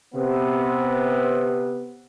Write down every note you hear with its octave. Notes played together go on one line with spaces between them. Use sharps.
C3 B3